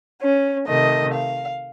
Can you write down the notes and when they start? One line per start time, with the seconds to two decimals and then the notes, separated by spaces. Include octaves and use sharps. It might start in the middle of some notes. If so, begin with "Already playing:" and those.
0.21 C#4
0.68 C3 D#3 A3 D#5
1.14 F5